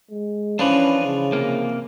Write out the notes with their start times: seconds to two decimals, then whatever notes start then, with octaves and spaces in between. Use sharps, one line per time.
0.10 G#3
0.59 E3 F3 C#4 D4 B4
1.03 C#3
1.33 C3 A#3